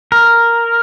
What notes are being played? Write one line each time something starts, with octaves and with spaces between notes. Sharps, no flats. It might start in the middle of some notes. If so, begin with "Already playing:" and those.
A#4